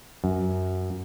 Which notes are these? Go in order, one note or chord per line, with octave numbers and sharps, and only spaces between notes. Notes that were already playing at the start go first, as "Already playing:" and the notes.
F#2